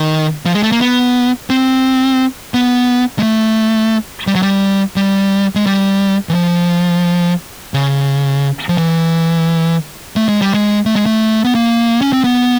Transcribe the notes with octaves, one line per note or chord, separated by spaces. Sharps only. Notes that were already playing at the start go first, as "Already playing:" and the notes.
Already playing: D#3
F3
G#3
A3
A#3
B3
C4
B3
G#3
A3
G3
F#3
G3
G3
G#3
G3
E3
F3
C#3
F3
E3
A3
G#3
G3
G#3
A3
G#3
A3
B3
A#3
C#4
C4
B3